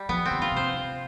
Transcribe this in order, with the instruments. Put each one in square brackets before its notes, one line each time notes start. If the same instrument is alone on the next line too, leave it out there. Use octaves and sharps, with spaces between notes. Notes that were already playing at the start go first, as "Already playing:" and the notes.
Already playing: [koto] G3
[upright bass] F3 [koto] B3
[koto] C4
[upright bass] D3
[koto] F4
[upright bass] C3 [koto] C5